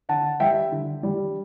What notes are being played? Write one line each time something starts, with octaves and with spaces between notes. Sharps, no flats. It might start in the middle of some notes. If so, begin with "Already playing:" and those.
D3 F#5 A5
G3 E5 G5
D3
G3